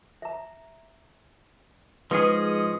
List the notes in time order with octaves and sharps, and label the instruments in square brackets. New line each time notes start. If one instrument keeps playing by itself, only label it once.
[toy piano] E5 A#5
[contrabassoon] G#2 [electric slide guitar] F3 C#4 G#4 [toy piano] B4 [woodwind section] D#5